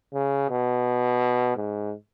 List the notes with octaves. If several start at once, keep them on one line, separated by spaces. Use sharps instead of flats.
C#3
B2
G#2